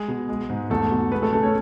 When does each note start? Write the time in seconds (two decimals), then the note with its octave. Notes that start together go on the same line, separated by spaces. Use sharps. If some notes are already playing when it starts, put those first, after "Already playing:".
Already playing: G#3 G#4
0.08 B2
0.29 G#3
0.50 G#2
0.70 E2 A3 A4
0.91 B2
1.12 G#3 B3 B4
1.22 A3 A4
1.32 C#3 A3 A4
1.43 C#4 C#5